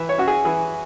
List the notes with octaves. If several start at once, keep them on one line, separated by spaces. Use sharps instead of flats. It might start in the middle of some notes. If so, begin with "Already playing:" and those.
Already playing: E3 E5
C#5
C#4 F#4
G#4
E3 G#4